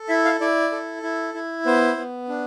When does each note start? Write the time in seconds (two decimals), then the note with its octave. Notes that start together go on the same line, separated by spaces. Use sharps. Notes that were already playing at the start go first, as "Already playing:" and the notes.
Already playing: A4
0.09 E4 E5
0.25 F5
0.41 E4 D5
0.72 A4
1.03 E4
1.34 E4
1.66 B3 C5
1.97 B3
2.29 D4